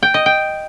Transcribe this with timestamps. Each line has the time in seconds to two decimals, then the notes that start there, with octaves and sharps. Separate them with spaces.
0.03 G5
0.14 D#5
0.26 G5